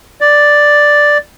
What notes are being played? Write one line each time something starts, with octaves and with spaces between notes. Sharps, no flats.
D5